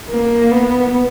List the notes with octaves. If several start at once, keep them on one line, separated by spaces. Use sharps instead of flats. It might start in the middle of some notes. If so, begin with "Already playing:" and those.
A#3
B3